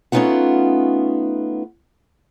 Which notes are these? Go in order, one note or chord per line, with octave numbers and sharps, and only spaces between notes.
A3 B3 C#4 D#4 F4 F#5